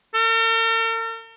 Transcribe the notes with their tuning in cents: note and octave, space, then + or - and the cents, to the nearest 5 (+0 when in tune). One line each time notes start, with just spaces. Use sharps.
A#4 -45